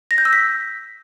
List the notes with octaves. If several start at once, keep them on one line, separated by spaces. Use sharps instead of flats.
A#6
G6
E6
B6